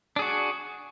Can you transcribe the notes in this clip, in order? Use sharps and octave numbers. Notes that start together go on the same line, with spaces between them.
D4 F#4 G#4